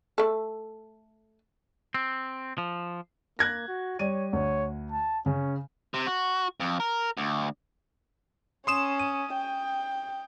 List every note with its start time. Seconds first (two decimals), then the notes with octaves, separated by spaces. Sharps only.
0.18 A3 A4
1.95 C4
2.58 F3
3.39 A#3 F#6 G#6 A#6
3.68 F#4
3.99 G3 C#5 D#7
4.33 D2 C#5
4.91 A5
5.26 C#3 C#4
5.94 C3
6.07 F#4
6.60 F2
6.80 A#4
7.17 D2
8.67 C#4 C6 D#6 E7
8.99 D#7
9.33 G5